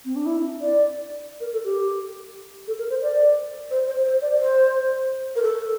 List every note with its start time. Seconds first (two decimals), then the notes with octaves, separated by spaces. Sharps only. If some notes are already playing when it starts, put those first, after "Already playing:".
0.05 C4
0.16 D4
0.26 E4
0.61 D5
1.40 A#4
1.53 A4
1.65 G4
2.68 A4
2.79 A#4
2.90 C5
3.02 D5
3.71 C5
3.87 C5
4.05 C5
4.22 D5
4.39 C5
5.36 A#4
5.42 A4